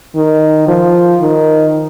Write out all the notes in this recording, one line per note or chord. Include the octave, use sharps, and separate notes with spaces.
D#3
F3
D#3